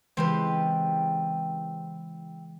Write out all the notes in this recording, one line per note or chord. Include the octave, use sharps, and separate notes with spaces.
C#3 E3 G#3 C4 G4 B4